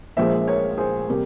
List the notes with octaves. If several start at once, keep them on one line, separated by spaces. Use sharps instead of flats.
A#1 A#2 F3 G#3 C5 E5
A#4 C#5
G#4 C5
C3 G3 A#3 G4 A#4